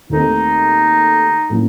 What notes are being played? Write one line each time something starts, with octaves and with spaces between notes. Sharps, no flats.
D#2 D#3 A3 C4 D#4
A2 F#3 A#3 C#4